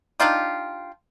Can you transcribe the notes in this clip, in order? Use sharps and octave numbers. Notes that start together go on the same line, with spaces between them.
D4 D#4 F4 G4